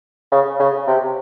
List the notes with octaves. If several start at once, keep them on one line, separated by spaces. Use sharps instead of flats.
C#3
C#3
C3